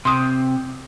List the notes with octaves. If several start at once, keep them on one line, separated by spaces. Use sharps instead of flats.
C3 C6 D#6